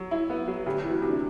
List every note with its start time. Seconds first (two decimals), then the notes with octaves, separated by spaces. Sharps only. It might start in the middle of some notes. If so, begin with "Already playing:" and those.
Already playing: F#3
0.11 E4
0.30 B3
0.48 F#3
0.66 D2 G4
0.84 E3
0.90 F#4
1.02 C3
1.09 D4